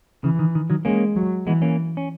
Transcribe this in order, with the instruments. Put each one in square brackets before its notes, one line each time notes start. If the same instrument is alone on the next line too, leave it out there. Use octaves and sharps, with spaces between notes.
[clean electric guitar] C#3 [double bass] E3
[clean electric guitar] D#3
D#3
D#3 F#3
[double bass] G#3 [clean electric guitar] A#3 C#4
[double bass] F#3
[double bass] E3 [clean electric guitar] G#3 B3
[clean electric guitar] A#3 C#4
C#4